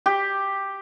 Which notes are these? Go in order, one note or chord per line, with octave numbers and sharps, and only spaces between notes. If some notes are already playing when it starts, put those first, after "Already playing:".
G4